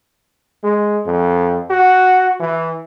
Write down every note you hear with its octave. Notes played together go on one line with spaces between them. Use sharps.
G#3
F2
F#4
E3